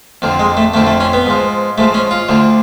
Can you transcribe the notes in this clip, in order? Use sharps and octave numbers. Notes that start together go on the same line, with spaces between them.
F2 D3 F3
G#3
A3
F2 D3 F3 A3
A3
C#4
B3
G#2 F3
G#2 F3 A3
C#4
F4
D2 D3 F3